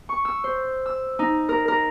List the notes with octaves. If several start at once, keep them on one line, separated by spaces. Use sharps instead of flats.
C#6
E6
C5
E6
D#4
A#4
A#4